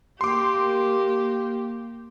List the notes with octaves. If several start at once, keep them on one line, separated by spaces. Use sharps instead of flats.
A#3 G4 C6 D6